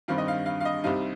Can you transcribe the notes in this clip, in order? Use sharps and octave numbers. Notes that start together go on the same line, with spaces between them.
G2 D#3 G3 C4 F5
D#5
F5
F5
F5
D#5
C2 C3 G3 C4 D#4 F5